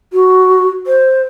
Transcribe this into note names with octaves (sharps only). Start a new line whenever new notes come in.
F#4
C5